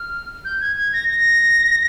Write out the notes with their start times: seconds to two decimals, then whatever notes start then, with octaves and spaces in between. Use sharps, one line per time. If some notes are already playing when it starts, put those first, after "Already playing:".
Already playing: F6
0.45 G6
0.61 G#6
0.77 G#6
0.93 A#6
1.09 A#6